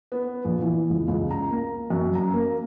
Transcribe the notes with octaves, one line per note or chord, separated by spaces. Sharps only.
B3
A#1
E3
C#2
C#2
A#5
A#3
F#2
A#5
A#3